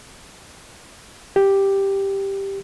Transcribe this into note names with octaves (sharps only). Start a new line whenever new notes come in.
G4